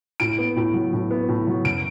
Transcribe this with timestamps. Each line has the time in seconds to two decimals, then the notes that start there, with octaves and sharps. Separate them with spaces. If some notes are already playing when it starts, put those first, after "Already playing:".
0.20 A2 D7
0.38 B3
0.56 A2
0.74 F#3
0.93 A2
1.11 B3
1.29 A2
1.47 F#3
1.65 F#2 D7